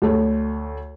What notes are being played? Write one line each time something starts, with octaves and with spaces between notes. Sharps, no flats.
D2 A3 C#5